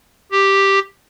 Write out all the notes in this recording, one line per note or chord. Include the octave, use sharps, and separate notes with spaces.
G4